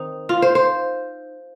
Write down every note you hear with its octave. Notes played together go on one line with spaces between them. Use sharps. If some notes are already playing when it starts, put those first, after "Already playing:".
Already playing: D#3 C4 D#4
F4
C5
C5